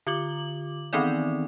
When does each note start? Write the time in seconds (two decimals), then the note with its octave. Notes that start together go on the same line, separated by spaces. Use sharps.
0.07 D3 F4 D6 F#7
0.93 D#3 E3 B3 C4 D#4 D5